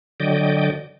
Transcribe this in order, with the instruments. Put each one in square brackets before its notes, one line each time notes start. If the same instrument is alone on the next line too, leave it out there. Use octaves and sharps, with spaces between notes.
[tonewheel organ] D3 F#3 D5 D#5 G5